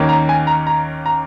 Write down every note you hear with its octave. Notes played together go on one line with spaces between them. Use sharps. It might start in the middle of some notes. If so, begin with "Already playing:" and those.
Already playing: D#2 D#3 A#3 C#4
A#5
G#5
A#5
A#5
A#5